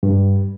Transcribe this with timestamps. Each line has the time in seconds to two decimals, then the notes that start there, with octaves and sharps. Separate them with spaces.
0.03 G2